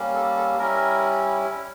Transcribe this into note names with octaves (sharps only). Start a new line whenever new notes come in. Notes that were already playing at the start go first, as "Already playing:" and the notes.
Already playing: G3 A#3 C#4
A4
A4
G3 C#4 E4 A#4